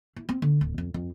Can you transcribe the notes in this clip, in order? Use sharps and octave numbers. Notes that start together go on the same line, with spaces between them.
E4
C4
D3
D1
F2
F2